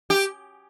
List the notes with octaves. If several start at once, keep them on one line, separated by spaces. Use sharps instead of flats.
G4